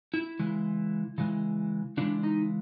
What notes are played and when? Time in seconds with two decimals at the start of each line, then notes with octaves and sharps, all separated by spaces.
0.14 E4
0.40 C#3 E3 G#3
1.18 C#3 E3 G#3
1.97 C#3 E3 G#3 D4
2.23 D#4